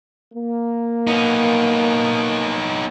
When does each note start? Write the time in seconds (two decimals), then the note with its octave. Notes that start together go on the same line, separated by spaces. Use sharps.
0.33 A#3
1.07 B3 D#4